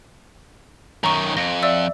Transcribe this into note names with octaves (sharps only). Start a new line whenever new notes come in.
F#2 D#3 A#5 C#6
F2 A#6
D5 E5 E6